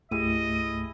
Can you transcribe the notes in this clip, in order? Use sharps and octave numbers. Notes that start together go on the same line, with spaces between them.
C2 G2 A3 E4 G4 G#4 D#5 D#7